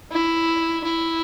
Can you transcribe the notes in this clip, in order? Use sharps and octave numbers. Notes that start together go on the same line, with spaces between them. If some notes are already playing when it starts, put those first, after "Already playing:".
E4
E4